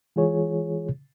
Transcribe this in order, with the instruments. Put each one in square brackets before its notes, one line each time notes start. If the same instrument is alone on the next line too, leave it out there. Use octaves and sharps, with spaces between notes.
[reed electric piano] E3 G#3 F4 G#4 C#5